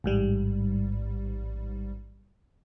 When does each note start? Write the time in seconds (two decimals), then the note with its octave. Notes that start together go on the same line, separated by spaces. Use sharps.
0.04 A1 G#2 G3